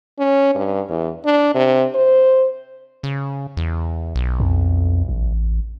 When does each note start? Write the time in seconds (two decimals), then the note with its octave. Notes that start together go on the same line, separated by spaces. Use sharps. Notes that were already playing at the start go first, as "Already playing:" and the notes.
0.19 C#4
0.55 G2
0.89 E2
1.25 D4
1.55 C3
1.95 C5
3.03 C#3
3.57 E2
4.15 B1
4.40 F2
5.09 A1